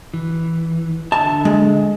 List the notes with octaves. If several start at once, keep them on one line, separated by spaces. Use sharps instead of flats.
E3
D3 E5 A5
G#3